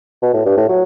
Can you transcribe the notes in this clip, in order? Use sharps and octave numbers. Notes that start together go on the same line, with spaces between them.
B2
A2
G2
A2
F#3